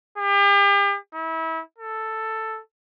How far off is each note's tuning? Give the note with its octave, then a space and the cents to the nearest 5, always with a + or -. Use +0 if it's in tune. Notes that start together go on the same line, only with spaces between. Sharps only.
G4 +40
E4 -30
A4 +5